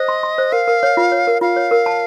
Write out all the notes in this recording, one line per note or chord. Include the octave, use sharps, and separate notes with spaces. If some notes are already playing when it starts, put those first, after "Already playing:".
Already playing: C5 D#5
C6
C6
C5
A#4 F5
A#4
C#5
F4
C#5
A#4
F4 F5
C#5
A#4
A5